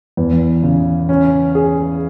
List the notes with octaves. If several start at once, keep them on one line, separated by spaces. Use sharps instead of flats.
E2
C#3
C#4
G#4